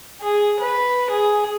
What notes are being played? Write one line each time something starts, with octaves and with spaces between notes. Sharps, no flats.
G#4
B4
G#4